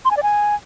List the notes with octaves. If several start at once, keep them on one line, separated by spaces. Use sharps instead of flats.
C6
G#5
D5
G#5